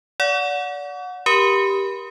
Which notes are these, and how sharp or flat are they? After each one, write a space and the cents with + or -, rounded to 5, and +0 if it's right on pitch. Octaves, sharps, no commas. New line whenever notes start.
D5 -30 F#5 -25 C#6 +45
G4 +0 A#4 +25 B5 +0